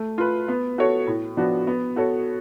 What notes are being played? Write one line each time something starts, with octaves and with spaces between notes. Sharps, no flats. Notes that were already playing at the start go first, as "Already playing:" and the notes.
Already playing: A3
F4 B4
B3
F#4 A4 C#5
A2
F3 B3 D4 F#4
B3
F#4 A4 C#5